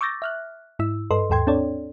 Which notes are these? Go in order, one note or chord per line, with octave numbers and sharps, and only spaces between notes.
C#6 D6 E6 G6 A6 A#6
E5 F6 F#6
G#2 E4 E6
G2 A4 B4 D#5 C6
D#2 G#2 A4 G5 C6 G#6
C4 D4 A4 C#5 D5